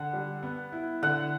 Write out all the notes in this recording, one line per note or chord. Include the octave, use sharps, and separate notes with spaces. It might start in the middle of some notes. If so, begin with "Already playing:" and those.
Already playing: D3 F#5
G3
B3
E4
D3 F#5